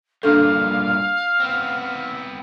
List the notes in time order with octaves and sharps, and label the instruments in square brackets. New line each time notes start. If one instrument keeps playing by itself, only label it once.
[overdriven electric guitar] G2 A#2 [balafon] D4 A4 [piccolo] F5
[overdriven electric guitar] B3 C4